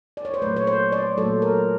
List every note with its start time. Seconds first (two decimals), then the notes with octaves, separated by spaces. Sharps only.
0.17 D5
0.25 C#5
0.34 C5
0.42 A#2 F#3 A3 B4
0.56 C#5
0.67 C5
0.92 D5
1.17 A#2 F#3 A3 A4
1.42 A#4